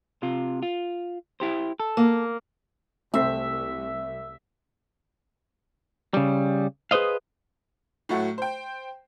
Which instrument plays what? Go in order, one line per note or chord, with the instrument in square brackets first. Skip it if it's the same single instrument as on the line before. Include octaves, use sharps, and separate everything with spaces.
[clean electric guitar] C3 F4
F4
E4 G4 C5
A4
[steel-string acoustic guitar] A#3
[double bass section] C2 [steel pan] A3 C4 [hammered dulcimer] E5
[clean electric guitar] C#3 G3
G#4 B4 C5 D#5 F5
[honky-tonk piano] A2 F#3 A3 F#5
C5 G5